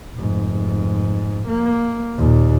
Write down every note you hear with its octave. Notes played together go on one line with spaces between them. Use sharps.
F1 G#2
A#3
D#2 A#2